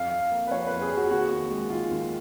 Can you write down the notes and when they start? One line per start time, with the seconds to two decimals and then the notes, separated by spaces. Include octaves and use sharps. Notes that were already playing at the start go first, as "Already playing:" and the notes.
Already playing: F2 F5
0.11 F2
0.31 A#3
0.47 B4
0.51 F3 C#5
0.67 F2 B4
0.81 G#4
0.91 F2
0.97 F#4
1.10 D#2 F#4
1.30 D#2
1.51 G#3
1.70 D#3 F4
1.91 D#2